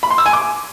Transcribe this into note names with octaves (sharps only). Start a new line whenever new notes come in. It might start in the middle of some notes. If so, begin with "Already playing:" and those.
B5
C6
E6
G#5
D6